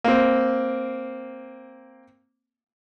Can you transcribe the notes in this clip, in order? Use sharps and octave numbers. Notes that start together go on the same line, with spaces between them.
A#3 C4